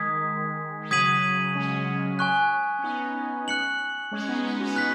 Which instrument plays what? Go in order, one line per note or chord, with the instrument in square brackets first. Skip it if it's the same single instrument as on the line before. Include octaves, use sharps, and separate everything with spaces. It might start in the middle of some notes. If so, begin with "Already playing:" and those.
Already playing: [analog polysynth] D#3 G#3 [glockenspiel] D#6 G#6 B6
[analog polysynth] G#3
[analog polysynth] C#3 F#3 [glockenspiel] D#6 G#6 B6 D#7 F#7
[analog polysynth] G#3 C#4
[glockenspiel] G#5 C#6 F#6
[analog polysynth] C#4
B3 D#4
[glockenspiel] F#6 C#7 F#7
[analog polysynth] G#3 C#4
B3 D#4
B3 D#4
C#4 F#4
[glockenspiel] F#6 B6